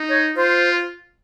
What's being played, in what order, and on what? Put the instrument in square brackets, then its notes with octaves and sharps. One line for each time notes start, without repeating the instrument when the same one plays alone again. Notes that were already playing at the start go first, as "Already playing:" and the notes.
Already playing: [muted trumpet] D#4
[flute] C#5
[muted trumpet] F4 [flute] C5